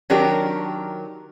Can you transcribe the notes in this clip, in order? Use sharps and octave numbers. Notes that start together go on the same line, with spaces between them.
D#3 F#3 D4 G4 A#4